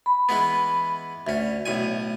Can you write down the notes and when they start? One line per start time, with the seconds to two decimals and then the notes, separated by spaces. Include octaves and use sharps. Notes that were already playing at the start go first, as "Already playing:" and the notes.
0.06 B5
0.29 E3 G#3 B3
1.27 D2 C#4 E5
1.66 B1 A2 G#5